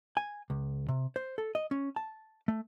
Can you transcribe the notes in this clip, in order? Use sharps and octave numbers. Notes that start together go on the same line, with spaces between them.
G#5
C#2
C3
C5
A4
D#5
C#4
A5
A3